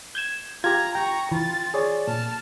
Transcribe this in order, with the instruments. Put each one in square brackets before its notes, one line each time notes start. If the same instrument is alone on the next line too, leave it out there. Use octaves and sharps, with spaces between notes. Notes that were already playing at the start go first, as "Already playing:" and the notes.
[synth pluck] G6 G#6 E7
[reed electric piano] F4 G4 [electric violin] A#5 [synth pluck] G#6
[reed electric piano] G5 [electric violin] A#5 C#6
[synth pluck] E3 [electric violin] F4 A6
[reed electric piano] G#4 C#5 D5
[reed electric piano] A#2 [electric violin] A5 F6